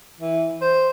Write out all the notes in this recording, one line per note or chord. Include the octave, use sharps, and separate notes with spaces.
E3
C5